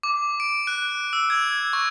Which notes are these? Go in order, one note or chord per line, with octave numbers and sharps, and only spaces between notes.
D6
D7
F#6
E6
G#6
C#6